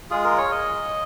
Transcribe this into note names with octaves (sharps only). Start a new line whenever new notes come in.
G#3 F4 G#4
A#4
C#5
D#5